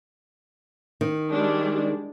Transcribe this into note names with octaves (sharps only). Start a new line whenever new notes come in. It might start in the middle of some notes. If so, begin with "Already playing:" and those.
D#3
G3 G#3 D4